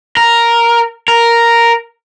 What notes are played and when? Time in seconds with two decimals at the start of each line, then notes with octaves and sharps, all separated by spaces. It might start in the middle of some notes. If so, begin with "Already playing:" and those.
0.17 A#4
1.08 A#4